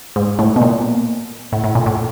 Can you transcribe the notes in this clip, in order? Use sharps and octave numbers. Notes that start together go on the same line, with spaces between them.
G#2
A2
B2
A#2
A2
A2
A#2
A2